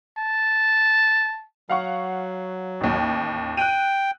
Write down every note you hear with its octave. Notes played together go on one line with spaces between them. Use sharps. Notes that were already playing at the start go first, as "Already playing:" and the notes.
A5
F#3 F5 F#5 C#6
A1 D#2
G5 F#6 D#7